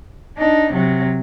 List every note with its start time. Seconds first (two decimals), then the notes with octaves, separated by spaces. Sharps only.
0.38 D4 D#4
0.72 C3 F#3